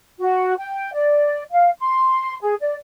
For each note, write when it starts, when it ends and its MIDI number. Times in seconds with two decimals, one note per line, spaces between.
0.19 0.54 66
0.58 0.93 79
0.94 1.44 74
1.52 1.70 77
1.79 2.36 84
2.42 2.55 68
2.61 2.75 74